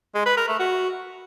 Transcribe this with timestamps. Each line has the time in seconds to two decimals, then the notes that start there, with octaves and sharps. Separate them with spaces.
0.14 G#3
0.26 B4
0.37 A#4
0.48 A3
0.59 F#4